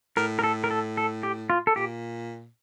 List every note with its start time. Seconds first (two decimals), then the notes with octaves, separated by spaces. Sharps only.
0.17 A2 A#4
0.39 A#4
0.44 A4
0.64 A#4
0.71 A4
0.97 A4
1.23 G4
1.50 F4
1.67 A4
1.76 A#2 G4